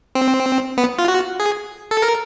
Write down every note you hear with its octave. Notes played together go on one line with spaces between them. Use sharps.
C4
B3
F4
F#4
G#4
A4
A#4